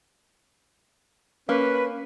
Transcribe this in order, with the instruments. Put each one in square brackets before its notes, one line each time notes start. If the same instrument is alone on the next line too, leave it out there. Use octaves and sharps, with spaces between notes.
[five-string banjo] A#3 [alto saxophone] C#4 [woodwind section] B4